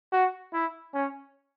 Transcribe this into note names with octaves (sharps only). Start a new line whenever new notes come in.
F#4
E4
C#4